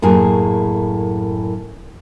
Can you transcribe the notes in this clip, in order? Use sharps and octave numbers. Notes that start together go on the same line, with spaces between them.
F#2 A2 A#3 G#4